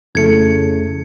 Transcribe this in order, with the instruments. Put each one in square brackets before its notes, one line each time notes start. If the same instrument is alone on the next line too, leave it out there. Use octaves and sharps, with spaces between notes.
[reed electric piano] F2 A3 [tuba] C#3 [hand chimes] E4 A4 [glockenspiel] G#6 C#7